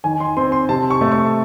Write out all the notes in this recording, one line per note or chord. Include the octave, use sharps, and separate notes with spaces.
D#3 G#5
C6
C4 C6
C6
C3 A5
C#6
A3
C#6